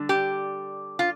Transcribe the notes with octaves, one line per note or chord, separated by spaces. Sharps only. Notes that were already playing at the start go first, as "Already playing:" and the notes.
Already playing: D3 G3 D4
G4
F4